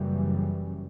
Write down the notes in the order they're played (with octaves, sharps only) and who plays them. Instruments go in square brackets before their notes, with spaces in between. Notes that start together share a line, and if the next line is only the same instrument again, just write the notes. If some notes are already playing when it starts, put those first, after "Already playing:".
Already playing: [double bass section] F#1 F#2 C#3 E3 G3